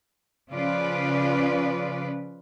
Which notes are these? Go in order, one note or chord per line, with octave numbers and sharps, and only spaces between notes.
C#3 F3 C#4 F4 B4 D5